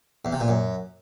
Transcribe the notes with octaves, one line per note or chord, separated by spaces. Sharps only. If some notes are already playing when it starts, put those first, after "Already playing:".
E2
C3
A#2
F#2